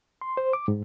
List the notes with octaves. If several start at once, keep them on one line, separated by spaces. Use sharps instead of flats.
C6
C5
D6
G#2